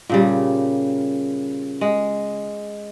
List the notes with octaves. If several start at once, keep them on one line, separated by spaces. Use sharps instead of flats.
A#2 C#3 G3
G#3